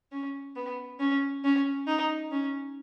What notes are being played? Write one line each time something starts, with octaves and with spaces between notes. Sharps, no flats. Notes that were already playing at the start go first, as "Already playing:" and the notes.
C#4
B3
C#4
C#4
D#4
C#4